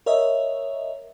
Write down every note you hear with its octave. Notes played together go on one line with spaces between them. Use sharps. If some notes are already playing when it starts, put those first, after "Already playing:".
A#4 C#5 D#5 E5